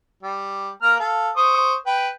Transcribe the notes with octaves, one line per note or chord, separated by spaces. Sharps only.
G3
A#3 A#5 F6
A4 F5
C5 C#6 D#6
B4 G5